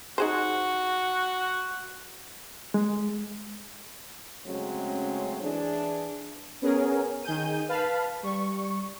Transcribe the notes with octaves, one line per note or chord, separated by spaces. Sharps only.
D#4 F#4 G#4 C5
G#3
C#3 F#3 G#3 A3 C4 C#4
E3 D4 G#4
B3 C#4 G#4 A#4
D#3 G#4 G6 D#7
B4 F5 A5 B5
G3 C#6